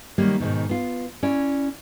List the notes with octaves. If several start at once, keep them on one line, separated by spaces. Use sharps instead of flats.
D#3 F#3 G3 A#3
G#2 B2 D#3
B3 F4
C#4 E4 D5